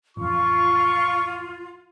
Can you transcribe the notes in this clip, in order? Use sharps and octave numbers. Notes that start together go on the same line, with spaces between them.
A1 F2 F4 C#6